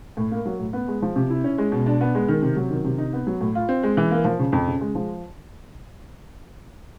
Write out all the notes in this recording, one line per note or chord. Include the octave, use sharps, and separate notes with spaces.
A2
A#3
F#3
A2
B3
G#3
F3
C3
E4
C#4
G#3
B2
D4
B3
G#3
D#3
C3
F#3
D#3
C3
D#4
B3
F#3
A2
F4
C4
G#3
E3
A#3
F3
C#3
F2
C#3
G#3
F3